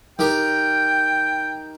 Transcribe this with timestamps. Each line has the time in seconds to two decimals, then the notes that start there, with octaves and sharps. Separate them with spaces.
0.19 D#3 G4 A#4 G5